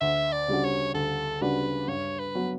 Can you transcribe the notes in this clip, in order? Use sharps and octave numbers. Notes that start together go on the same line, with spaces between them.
D2 E5
D5
C#3 G3 D4 F#4
C#5
D2 A4
C#3 G3 D4 F#4 B4
G2 C#5
B4
F#3 B3 F#4